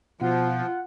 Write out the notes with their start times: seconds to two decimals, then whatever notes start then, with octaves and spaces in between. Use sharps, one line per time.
0.21 B2 F3 F4 F#5